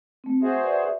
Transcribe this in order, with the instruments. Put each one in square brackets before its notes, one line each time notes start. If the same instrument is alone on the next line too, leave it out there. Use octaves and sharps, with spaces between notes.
[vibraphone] A3 C4
[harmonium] F#4 G#4 C5 [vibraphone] E5
[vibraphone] B4 D5 E5